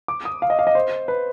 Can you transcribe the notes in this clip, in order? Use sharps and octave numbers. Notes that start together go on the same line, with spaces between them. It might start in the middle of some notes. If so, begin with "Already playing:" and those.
D6
D#6
F5
D#5
F5
D#5
C5
B4